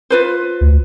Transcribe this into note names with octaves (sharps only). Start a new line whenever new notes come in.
F4 B4 C5
D2